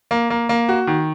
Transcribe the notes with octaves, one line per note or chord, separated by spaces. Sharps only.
A#3
A#3
A#3
F#4
D#3